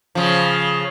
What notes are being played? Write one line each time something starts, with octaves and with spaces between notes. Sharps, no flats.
C#3 F3